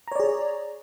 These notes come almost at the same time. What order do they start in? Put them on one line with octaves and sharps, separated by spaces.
A#5 C#5 D5 G#4